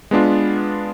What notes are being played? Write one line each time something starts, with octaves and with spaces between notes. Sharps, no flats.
G#3 B3 D4 F4